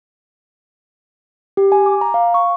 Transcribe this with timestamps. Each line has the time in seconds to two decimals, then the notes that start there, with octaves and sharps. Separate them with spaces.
1.57 G4
1.72 G#5
1.86 D6
2.01 A#5
2.14 F5
2.34 C#6